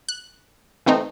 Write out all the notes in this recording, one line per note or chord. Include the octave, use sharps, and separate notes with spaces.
F#6
E3 A3 C4 D#4